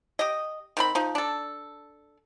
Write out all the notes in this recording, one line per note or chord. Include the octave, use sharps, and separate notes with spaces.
G4 D#5
D#3 C4 B5
F3 D#4
D4 A4